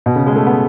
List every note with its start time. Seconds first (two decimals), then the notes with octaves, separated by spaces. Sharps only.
0.06 B2
0.16 C#3
0.26 G#3
0.36 A3
0.47 B3